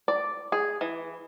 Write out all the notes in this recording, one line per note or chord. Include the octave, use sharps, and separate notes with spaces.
D5
G#4
E3